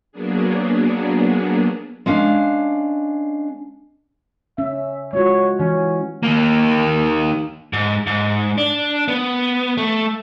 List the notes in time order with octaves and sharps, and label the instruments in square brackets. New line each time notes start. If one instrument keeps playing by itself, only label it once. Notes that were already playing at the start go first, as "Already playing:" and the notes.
[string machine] F#3 A#3 B3 D4 G#4
[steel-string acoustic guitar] G#3 C#4 D4 F5
[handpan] C#4 [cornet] E5
[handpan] G#3 F4 F#4 [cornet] C#5
[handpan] E3 [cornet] C#4
[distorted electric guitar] D#3 A#3
[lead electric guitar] G#2
G#2
D4
B3
A3